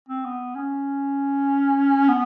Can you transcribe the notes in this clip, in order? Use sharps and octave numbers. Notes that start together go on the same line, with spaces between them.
C4
B3
C#4
B3